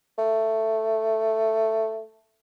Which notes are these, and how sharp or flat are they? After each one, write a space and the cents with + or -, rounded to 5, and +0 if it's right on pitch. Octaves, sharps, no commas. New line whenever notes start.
A3 +10